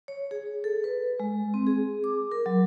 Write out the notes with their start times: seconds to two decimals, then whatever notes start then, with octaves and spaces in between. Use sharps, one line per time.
0.08 C#5
0.31 G#4
0.64 A4
0.84 B4
1.20 G#3
1.54 C4
1.67 G#4
2.04 D6
2.32 A#4
2.46 F#3